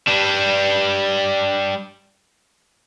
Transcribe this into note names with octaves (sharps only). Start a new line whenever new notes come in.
G3 D4